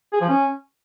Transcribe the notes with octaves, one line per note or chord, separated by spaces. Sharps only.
G#4
F3
C#4